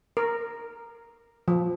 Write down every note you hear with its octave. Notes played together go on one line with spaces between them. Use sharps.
A#4
F3